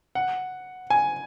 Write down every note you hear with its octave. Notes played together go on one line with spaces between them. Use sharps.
F#5
G#5